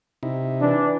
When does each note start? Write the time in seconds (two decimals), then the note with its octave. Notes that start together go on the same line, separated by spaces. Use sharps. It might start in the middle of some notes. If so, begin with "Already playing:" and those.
0.23 C3 D#4 E4
0.61 E3 D4